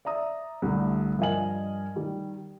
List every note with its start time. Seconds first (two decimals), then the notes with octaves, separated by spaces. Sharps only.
0.05 D5 E5 A#5 D#6
0.62 C2 D3 G3 A3
1.19 G2 F3 A#4 D#5 G#5 F#7
1.96 D#3 G3